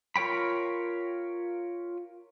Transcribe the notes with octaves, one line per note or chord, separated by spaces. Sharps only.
F4 A#4 C#5 G5 B5